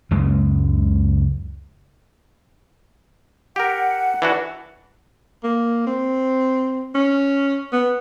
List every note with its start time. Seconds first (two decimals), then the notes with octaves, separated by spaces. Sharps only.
0.11 C#2 F#2 C#3 G#3
3.56 G4 A#4 F#5
4.22 E3 D4 F#4
5.44 A#3
5.87 C4
6.95 C#4
7.72 B3